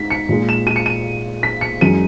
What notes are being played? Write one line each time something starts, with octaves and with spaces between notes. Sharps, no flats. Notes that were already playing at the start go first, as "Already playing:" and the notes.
Already playing: G#2 B6
C#7
A#2 G#3
E7
D#7
C#7
D#7
B6
C#7
F#2 E3 G#3 D#7